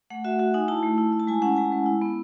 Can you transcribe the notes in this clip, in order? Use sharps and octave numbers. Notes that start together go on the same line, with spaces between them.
A3 F#5
F#4 E5
F#4 F#5
D#4 G#5
E4 A5
A3
E4
E4
A5
G#3 G#5
C#4 F#5
G#3 G#5
G#3
E4
B3